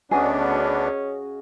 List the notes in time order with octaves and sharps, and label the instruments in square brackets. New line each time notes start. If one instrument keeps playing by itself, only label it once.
[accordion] D2 B3 D4 [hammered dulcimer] C#3 F#4 D#5 [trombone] C#4 [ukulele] G#4